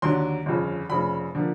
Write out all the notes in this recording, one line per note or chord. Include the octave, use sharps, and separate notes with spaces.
D#2 D3 F#3 C6
G1 F2 C#3
F1 F2 C#3 B5
D3 F3 A#3